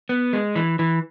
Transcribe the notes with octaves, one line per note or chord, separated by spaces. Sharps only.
B3
G#3
E3
E3